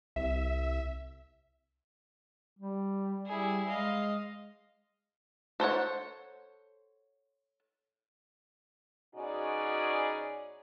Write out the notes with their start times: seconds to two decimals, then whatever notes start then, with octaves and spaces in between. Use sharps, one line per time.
0.16 C2 E5
2.59 G3
3.26 G3 E4 G#4
3.69 G#3 D#5 F5
5.60 A4 C5 C#5 F#5
9.14 B2 C#4 D#4 F#4 G#4 D5